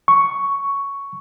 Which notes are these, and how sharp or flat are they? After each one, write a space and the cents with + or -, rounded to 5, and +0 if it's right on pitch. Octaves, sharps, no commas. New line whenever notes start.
C#6 +5